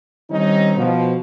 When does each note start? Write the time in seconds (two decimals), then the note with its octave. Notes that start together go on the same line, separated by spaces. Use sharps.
0.30 D#3 G3 C4 C#4 D#4
0.77 B2 F3